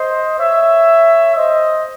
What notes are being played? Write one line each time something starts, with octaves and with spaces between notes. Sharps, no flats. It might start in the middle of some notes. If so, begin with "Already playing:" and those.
Already playing: C5 D#5
C#5 E5
C5 D#5